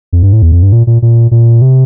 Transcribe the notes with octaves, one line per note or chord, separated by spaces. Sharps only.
F2
G2
A2
E2
F2
G2
A#2
A#2
A#2
A#2
C3